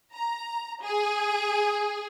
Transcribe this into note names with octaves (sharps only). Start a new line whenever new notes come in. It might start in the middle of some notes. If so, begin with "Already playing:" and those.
A#5
G#4